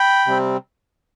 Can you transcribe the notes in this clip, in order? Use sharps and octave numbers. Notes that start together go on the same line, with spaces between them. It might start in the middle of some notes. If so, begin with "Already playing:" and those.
Already playing: G5 B5
C3 G3 C4